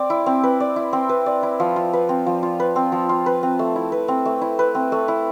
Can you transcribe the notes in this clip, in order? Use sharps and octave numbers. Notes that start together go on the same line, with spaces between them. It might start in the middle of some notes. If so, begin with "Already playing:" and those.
Already playing: C4 D5
E4
C4
B4
D5
E4
C4
B4
D5
E4
F3
F4
B4
C4
F3
F4
B4
C4
F3
F4
B4
C4
A3
E4
B4
C4
A3
E4
B4
C4
A3
E4